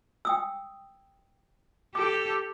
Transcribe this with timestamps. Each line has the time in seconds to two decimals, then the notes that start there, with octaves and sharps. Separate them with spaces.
0.25 G5 D#6 E6
1.95 G4 A4 D6